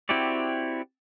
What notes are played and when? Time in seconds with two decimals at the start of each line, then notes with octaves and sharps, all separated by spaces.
0.09 C4 E4 F#4 G4 D5